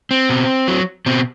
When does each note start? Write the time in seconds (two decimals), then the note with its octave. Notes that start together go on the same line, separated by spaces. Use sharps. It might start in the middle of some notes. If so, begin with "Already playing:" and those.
0.11 C4
0.30 B2
0.68 F#3
1.06 B2 C4